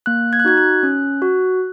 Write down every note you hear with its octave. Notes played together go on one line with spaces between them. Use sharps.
A#3 F#6
G#6
F#6
D#4 F#4 G#6
F#6
C#4
F#4